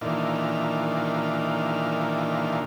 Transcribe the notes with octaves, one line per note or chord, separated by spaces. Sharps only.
A#2 D#3 E3 D4 F4